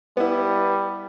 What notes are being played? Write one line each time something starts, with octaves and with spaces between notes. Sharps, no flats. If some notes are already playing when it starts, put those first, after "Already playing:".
G3 B3 E4